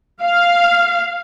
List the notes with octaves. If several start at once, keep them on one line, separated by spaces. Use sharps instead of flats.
F5